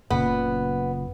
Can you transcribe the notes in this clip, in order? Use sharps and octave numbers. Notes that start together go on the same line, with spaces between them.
F#1 A#2 C#3 B3